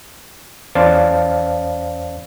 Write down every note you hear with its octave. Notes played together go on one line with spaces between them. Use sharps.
E2 C#4 C5 D5 F5 A5